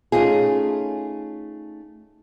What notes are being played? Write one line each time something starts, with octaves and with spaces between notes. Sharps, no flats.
A3 C#4 D#4 F4 G#4